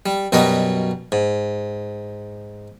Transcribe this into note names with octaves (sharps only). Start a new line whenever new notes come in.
G3
F#2 B2 F#3 G3 D#5
G#2